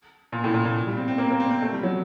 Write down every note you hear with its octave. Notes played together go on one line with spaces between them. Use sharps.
A#2
A2
A#2
A#2
G3
C4
C4
A#3
A#3
C4
C4
A3
G3
F#3